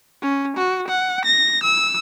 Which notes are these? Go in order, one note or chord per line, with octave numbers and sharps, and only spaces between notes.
C#4
F#4
F#5
A#6
E6